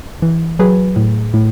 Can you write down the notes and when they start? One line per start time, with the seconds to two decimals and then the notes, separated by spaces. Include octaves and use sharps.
0.22 E3
0.59 F#3 G#4 B4
0.96 A2
1.34 A2